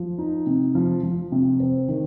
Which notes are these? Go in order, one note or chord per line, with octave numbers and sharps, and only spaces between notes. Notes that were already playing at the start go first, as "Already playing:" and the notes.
Already playing: F3
D#4
C3
F3
F3
C3
C4
D#3